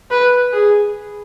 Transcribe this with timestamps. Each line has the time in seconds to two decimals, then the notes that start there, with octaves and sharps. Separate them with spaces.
0.11 B4
0.53 G#4